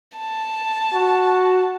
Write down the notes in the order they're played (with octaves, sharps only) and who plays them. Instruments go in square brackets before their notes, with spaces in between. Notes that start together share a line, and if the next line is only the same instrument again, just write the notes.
[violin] A5
[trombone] F#4